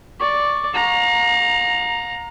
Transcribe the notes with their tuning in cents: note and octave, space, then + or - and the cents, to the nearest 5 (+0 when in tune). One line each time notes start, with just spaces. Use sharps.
D5 +0 C#6 +0
F5 +40 A#5 +0